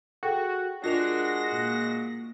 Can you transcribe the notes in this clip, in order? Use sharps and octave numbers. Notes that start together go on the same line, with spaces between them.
F#4 G#4 A4 G5
G#3 D4 F4 F#4 A#4 A#6 F7
A#2